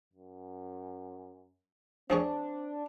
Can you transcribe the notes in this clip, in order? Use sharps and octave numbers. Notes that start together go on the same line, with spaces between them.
F#2
F3 C4 D4 G#4 C#5